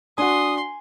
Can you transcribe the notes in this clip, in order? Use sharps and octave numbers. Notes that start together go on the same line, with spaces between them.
D4 F#4 G#5 C6 D#6